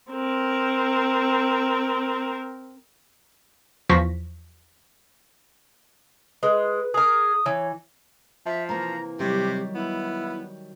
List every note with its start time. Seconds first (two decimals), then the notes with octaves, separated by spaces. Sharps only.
0.11 C4 A#4
3.89 E2 F3 C5 C#6 A#6 B6
6.43 G#3 B4
6.94 G#4 A#4 D#6
7.46 E3 C#5
8.46 F3 E5
8.69 C3 E3 A#3 A#5
9.19 C3 D#3 F#3 G3 G4
9.75 B3 E4